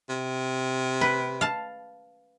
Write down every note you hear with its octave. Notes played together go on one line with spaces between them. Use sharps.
C3
B4
F5 A5